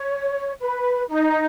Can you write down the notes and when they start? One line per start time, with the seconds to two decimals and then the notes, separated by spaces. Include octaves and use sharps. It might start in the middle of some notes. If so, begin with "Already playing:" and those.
Already playing: C#5
0.61 B4
1.09 D#4